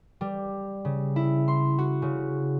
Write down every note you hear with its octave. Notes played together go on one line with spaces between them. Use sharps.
G3
C#3
E4
C6
F#4
C#3